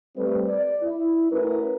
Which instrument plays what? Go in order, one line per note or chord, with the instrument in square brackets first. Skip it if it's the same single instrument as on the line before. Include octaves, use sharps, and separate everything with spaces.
[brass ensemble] G3 A3 C4 B4
D5
E4
A3 C#4 E4 F#4 A#4 B4